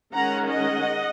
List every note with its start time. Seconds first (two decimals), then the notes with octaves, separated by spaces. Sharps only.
0.13 D#3 G#3 C#4 F#5 A#5
0.48 D#5 F#5